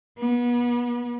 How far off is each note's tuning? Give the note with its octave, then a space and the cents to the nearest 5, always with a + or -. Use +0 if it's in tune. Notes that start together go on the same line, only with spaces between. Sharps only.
B3 -35